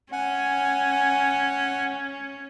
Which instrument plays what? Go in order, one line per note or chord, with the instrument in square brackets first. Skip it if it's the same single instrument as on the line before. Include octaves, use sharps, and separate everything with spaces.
[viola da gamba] C#4 [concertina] F#5 G#5